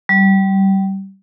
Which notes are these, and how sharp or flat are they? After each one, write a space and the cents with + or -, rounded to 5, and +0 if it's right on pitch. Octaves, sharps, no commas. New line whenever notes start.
G3 -20